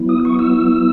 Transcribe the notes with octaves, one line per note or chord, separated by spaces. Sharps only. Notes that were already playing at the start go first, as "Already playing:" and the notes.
Already playing: F#3 B3 E4
D#6
C#6
E6